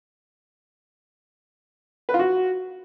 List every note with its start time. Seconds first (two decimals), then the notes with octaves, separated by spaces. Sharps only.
2.09 B4
2.14 F4
2.19 F#4